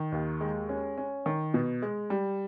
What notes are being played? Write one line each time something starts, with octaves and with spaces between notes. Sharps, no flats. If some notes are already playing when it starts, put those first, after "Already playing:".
Already playing: D#3
D#2
G#3
C#4
C#4
D#3
B2
G#3
G3